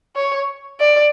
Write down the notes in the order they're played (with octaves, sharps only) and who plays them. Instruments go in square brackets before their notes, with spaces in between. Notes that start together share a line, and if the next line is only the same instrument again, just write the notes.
[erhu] C#5
D5